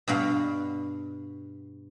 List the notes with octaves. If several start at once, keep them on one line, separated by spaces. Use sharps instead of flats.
G2 B2 B3 F5